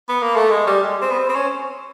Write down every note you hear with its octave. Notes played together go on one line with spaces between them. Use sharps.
B3
A#3
A3
G#3
G3
G#3
C4
B3
C4
C4
C#4